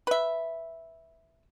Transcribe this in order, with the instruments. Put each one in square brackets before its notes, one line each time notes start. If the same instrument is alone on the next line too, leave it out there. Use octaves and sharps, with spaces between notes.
[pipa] B4 E5